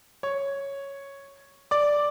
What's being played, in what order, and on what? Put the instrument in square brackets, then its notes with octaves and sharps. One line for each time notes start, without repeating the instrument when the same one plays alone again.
[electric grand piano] C#5 C#6
D5 D6